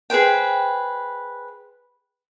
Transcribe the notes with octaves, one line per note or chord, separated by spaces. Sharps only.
G#4 B4 C5 G5